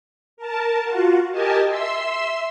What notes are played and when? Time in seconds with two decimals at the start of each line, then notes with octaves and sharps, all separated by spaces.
0.37 A#4 A5
0.84 F4 F#4
1.31 G4 A#4 D#5 G#5 A5
1.67 E5 C6 E6